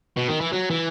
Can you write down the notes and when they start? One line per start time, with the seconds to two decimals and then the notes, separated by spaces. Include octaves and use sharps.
0.17 B2
0.28 D#3
0.41 E3
0.52 F#3
0.70 E3